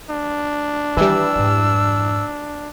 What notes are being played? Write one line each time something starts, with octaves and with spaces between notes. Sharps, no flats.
D4
D#3 E3 G3 E6
F2 G#2